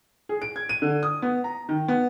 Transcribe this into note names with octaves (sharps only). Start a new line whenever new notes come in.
G#4
D7
G#6
D#7
D3
D#6
B3
A#5
D#3
B3